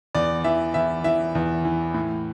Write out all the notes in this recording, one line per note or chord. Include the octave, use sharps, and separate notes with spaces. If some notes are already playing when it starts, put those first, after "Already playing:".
E2 D5
E3 E5
E2 E5
E3 E5
E2
E3
A2